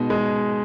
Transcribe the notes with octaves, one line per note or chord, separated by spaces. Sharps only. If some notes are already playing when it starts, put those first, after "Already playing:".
Already playing: B2 G#3 D#4
G#3